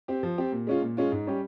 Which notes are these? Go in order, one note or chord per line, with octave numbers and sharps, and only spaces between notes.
C4 G4
F3
C4 G4
A#2
G#3 C#4 F4
A#2
G#3 C#4 F4
G#2
G3 C#4 G4